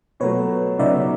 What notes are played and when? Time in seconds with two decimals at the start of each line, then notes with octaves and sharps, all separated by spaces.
0.20 B2 F#3 A3 B4 C#5
0.79 C#3 F#3 B3 D#4 D5 E5